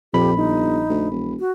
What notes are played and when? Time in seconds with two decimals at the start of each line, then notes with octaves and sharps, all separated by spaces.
0.14 A#1 F2 G4 B5
0.36 G1 D#4
0.89 D2
1.11 E1
1.40 F#4